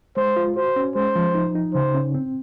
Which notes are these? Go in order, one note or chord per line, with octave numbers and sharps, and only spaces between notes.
G#3 C5
F4
F#4 C5
C#4
G#3 C5
F3
D#4
D#4
C#3 C5
C#4
C4